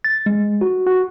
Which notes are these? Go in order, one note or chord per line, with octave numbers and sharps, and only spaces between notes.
A6
G#3
F#4
F#4